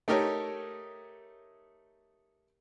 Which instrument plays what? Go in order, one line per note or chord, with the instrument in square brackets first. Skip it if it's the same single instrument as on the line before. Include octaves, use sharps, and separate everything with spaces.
[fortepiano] A3 D#4 G4 A#4 C#5